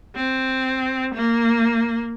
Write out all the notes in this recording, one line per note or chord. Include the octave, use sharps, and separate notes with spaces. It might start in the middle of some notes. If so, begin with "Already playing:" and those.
C4
A#3